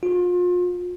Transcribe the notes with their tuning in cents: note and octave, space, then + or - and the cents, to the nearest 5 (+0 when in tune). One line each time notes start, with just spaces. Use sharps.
F4 +35